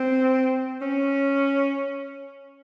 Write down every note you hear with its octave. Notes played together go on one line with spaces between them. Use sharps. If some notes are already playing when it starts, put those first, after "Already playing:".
Already playing: C4
C#4